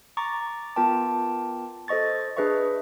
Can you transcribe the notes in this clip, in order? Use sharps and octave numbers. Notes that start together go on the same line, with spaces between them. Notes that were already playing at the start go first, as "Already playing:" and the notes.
A#5 C#6 D6 A6
B3 F4 A#4 G5 A5 D6
A4 C5 D#5 C#6 A6
D4 G#4 B4 D#5 E5 C#6